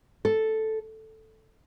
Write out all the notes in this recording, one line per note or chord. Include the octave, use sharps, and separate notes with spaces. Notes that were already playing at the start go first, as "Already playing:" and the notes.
A4